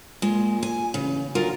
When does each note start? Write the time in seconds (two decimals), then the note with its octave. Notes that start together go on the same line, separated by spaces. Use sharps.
0.22 A#2 G#3
0.63 G#5
0.94 A1 C#3
1.35 D2 F#3 F4 A#4